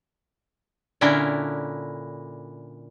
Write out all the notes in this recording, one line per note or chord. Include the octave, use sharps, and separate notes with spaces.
A#2 D3 C#4 D4 E4 A#4